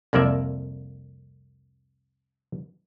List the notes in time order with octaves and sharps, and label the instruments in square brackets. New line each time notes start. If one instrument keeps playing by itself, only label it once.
[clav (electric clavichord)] C2 F2 A#3 D5 E5